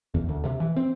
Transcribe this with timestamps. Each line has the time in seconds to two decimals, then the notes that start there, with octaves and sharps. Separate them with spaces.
0.14 E2
0.29 D2
0.45 C3
0.60 E3
0.76 C4